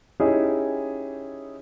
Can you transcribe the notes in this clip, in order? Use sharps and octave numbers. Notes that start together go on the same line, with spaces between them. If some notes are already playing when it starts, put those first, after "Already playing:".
C#4 D#4 E4 G4 G#4 C#5